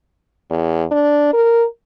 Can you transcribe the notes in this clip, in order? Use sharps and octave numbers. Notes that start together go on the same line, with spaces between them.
E2
D4
A#4